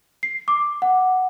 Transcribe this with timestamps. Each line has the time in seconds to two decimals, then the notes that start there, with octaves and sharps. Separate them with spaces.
0.23 C7
0.48 D6
0.82 F#5